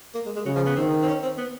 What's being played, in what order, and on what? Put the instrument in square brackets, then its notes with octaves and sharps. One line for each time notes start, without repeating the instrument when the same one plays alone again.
[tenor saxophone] A#3
G#3
G#3
[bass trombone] C#3 [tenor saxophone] F#3
[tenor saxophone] F3
B3
[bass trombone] D#3 [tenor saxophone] C4
[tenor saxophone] C4
C#4
C4
B3